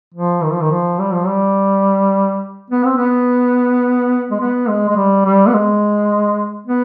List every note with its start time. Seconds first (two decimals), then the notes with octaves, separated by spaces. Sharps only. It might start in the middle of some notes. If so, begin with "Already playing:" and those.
0.14 F3
0.43 D#3
0.52 F3
0.61 D#3
0.71 F3
1.00 G3
1.13 F3
1.27 G3
2.70 B3
2.84 C4
2.97 B3
4.31 G#3
4.40 B3
4.69 G#3
4.89 G#3
4.96 G3
5.25 G3
5.47 B3
5.54 G#3
6.66 B3